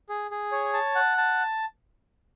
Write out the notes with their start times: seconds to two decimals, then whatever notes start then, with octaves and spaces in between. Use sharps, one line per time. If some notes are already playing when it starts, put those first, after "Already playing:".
0.09 G#4
0.31 G#4
0.52 C#5
0.73 A5
0.95 F#5
1.17 A5